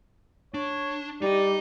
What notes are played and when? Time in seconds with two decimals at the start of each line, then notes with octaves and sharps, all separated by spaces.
0.54 D4 C#5
1.22 G3 D#4 D5 D#5